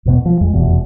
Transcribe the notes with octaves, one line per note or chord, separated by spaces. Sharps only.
E2 B2 B3
F3
F2 G#3
F1 E2 B2